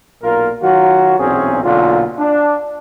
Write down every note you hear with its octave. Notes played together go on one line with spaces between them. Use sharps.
B1 A#2 F4 A#4
D#3 F#3 F4 F#4
B1 E2 A#2 C4 C#4 G#4
B1 A#2 D3 F4
D4